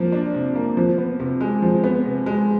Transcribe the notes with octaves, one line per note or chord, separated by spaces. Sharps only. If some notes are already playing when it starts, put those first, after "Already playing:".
Already playing: F3 A#3
D4
C3
A#3
F3
B3
C3
G#3
F3
B3
C3
G#3